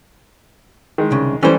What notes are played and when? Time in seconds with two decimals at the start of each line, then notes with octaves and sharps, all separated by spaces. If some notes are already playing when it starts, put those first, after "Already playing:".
0.98 D#3 G#3
1.11 C2 C#3
1.43 E3 G3 A3 C#4 C5